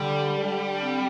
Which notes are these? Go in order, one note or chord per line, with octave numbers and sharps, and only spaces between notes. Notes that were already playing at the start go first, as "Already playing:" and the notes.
Already playing: D3 G3
D3
C4